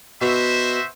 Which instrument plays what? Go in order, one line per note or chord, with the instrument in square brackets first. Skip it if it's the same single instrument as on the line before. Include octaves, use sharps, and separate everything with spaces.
[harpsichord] B2 [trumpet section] F#4 C5 E5